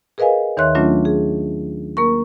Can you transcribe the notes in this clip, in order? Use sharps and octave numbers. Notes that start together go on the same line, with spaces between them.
G#4 A#4 B4 D#5 F5 G#5
D#2 D#3 C#5 E5 C6 F#6
F#3 A3 C#4 D4 F4
G#4
A#3 A#4 C#6